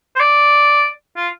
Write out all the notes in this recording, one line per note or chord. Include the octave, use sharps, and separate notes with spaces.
C5
D5
F4